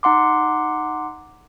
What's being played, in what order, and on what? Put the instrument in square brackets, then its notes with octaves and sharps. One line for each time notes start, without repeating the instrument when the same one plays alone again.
[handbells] D#4 F#5 C6 D6